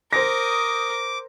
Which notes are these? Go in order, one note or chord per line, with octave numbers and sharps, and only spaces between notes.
A#4 C5 D6 D#6 A#6